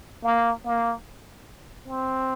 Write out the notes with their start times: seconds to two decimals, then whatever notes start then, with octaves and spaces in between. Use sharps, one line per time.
0.24 A#3
0.66 A#3
1.88 C4